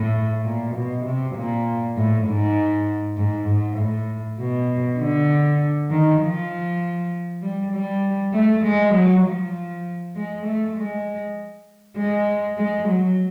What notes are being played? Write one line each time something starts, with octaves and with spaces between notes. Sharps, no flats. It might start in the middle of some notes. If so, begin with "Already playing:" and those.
Already playing: A2
A#2
B2
C3
A#2
A2
G#2
G#2
G#2
A2
B2
D3
D#3
F3
G3
G3
A3
G#3
F#3
F3
G#3
A3
G#3
G#3
G#3
F#3